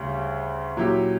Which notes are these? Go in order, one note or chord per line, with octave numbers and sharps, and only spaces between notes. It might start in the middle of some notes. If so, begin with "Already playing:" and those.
Already playing: D2 C#3 G3
A#2 F#3 C#4 E4 G4